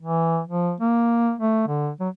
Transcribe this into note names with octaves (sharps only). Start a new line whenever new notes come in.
E3
F3
A#3
A3
D3
F#3